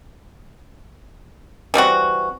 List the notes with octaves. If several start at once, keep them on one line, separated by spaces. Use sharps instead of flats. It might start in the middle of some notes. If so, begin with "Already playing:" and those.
E3 G3 C4 F#4